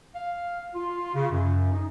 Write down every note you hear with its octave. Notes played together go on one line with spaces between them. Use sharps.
F5
F4
C#3
F#2
D#4